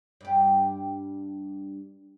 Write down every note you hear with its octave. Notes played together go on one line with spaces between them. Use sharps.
G2 G4